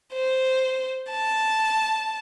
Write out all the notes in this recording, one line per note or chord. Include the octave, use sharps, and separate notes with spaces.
C5
A5